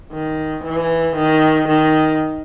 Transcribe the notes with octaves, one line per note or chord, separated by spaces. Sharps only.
D#3
E3
D#3
D#3